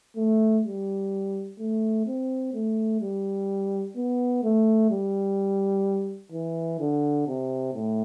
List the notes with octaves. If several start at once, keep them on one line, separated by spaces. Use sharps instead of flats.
A3
G3
A3
C4
A3
G3
B3
A3
G3
E3
D3
C3
A2